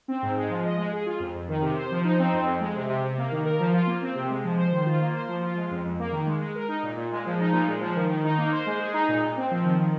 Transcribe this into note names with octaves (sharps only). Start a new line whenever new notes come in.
C4
G#2
G#3
F3
D#5
G#3
G#4
F4
F2
F2
D#3
C3
C5
F3
D#4
C4
F2
F2
G#3
C3
C3
C3
A#3
D#3
A#4
F3
F4
A#3
C4
C3
G#3
F3
C5
D#3
F4
A#3
C5
F3
F4
G#3
F2
F2
A#3
D#3
G#3
G#3
A#4
D#4
A#2
A#2
G#3
F3
D#4
A#2
G#3
F3
D#3
D#3
D#4
A#3
C5
G#3
G#4
D#4
A#2
A#2
C4
F3
D#3
D#3